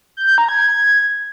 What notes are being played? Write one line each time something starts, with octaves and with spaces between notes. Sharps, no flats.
G6
G6
A#5
G#6